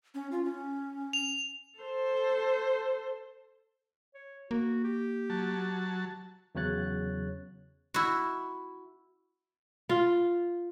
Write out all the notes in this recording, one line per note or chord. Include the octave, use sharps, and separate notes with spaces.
C#4
F4
C#4
F7
A4 C5
C#5
A#3 F#4
G4
F#3 A5
E2 C#3 F#3 C#5 F#6 A6
E4 F#4
F4